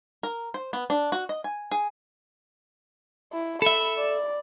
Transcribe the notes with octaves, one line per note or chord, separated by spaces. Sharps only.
A#4
C5
B3
D4
F#4
D#5
G#5
G#4
E4
A4 E5 B5
D5